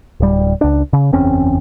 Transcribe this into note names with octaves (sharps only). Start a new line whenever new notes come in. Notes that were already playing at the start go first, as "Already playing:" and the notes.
D1 G3
C#2 D4
C#3
F#1 E2 C4 C#4